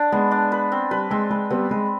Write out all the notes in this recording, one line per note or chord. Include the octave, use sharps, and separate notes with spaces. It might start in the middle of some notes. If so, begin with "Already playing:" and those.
Already playing: D4
G#3 B3
D4
B4
C4
G3 B4
G#3 C4
G#3 B4
G3 B3 C4
G#3 B4